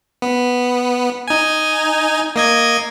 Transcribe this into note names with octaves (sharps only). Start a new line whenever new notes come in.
B3
D#4 G#5
A#3 D#5 G#6